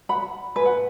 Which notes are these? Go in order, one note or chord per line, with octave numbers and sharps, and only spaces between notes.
F#5 B5
B4 G#5
F#5